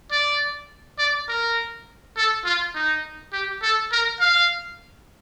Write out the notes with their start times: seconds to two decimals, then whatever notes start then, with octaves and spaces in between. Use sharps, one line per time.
0.11 D5
0.98 D5
1.28 A#4
2.16 A4
2.45 F4
2.75 D#4
3.33 G4
3.62 A4
3.92 A#4
4.20 F5